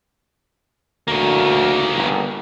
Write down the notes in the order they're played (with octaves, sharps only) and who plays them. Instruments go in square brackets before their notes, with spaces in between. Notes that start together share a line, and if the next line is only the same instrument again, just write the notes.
[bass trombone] D2 [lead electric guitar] C#3 A#3
[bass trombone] G1